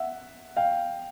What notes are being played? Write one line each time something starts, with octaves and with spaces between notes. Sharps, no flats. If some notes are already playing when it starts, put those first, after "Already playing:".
Already playing: E5 F#5
F5 G5